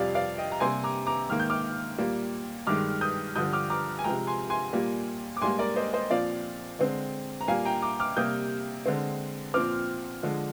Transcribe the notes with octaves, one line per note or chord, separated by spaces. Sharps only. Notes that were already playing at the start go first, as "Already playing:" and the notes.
Already playing: F2 C3 G3 D5 F5
D5 F5
D#5 G5
A#5
C3 G3 A#3 G#5 C6
A#5 D6
A#5 D6
G#2 D#3 A#3 F6
G6
D6 F6
A#2 G3 A#3
G2 D#3 G#3 D6 F6
D#6 G6
G2 D3 F3 D#6 G6
D6 F6
A#5 D6
G#5
C3 F3 G#3 G5 A#5
G#5 C6
G#5 C6
A#2 G3 A#3
D6
G#2 G3 A#3 G#5 C6
A#4 D5
C5 D#5
C5 D#5
A#2 F3 C4 D5 F5
D3 G#3 C4
A#5
A#2 G3 A#3 F5 G#5
G5 A#5
A#5 D6
D6 F6
C3 G3 A#3 D#6 G6
D3 G#3 C4
A#2 F3 C4 D6 F6
D3 F3 G#3